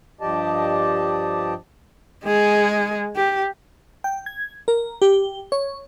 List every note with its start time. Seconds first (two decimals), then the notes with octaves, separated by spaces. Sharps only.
0.21 G2 F3 G4 D5 D#5 A5
2.24 G#3 G#4
3.16 G4
4.04 G5
4.26 G#6
4.68 A#4
5.02 G4
5.52 C#5